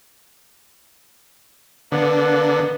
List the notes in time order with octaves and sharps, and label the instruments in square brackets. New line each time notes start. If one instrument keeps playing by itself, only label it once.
[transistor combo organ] D3 [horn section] A#3 B3